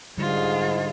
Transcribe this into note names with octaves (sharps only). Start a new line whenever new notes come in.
G#2 D3 G3 F4 G#4